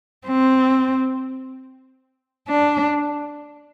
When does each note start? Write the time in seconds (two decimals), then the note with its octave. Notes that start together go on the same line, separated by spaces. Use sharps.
0.27 C4
2.49 D4